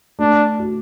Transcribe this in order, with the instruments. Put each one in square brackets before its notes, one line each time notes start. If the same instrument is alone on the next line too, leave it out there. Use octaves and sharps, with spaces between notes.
[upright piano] A3 [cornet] D4
[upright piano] F#4